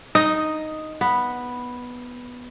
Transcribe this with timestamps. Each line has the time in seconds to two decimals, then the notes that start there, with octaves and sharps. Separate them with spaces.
0.15 D#4 D#5
1.01 B3